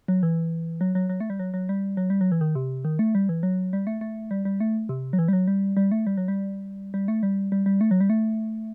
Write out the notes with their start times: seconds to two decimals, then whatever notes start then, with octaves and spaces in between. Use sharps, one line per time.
0.08 F#3
0.23 E3
0.81 F#3
0.95 F#3
1.10 F#3
1.20 A3
1.30 G3
1.39 F#3
1.54 F#3
1.69 G3
1.97 F#3
2.10 G3
2.21 F#3
2.32 E3
2.41 D#3
2.55 C3
2.85 D#3
2.99 A3
3.15 G3
3.29 E3
3.43 F#3
3.73 G3
3.87 A3
4.01 A3
4.31 G3
4.45 G3
4.60 A3
4.89 C3
5.13 F#3
5.19 E3
5.28 G3
5.33 F#3
5.47 G3
5.77 G3
5.92 A3
6.07 G3
6.17 F#3
6.28 G3
6.94 G3
7.08 A3
7.23 G3
7.52 G3
7.66 G3
7.81 A3
7.91 F#3
8.00 G3
8.10 A3